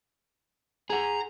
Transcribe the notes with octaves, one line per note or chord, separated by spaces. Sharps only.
G#4 F#5 A#5